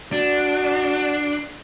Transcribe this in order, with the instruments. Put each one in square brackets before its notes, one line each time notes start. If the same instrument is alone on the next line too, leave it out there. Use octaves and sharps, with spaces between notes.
[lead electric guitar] D4 [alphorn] F#4